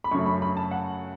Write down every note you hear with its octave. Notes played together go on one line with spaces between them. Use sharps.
B5
F#2 C#3 F#3 A3 C#6
B5
B5
A5
F#5